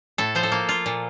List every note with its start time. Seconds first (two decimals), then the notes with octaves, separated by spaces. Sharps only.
0.18 A2 A4
0.35 F3 C5
0.43 A4
0.52 A#3
0.69 F4
0.86 A#2